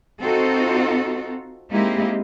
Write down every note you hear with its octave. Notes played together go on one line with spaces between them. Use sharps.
C4 D#4 F4 F#4 A4
G#3 A#3 C4 D#4 E4 G4